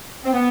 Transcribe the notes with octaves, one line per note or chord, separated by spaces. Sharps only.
C4
B3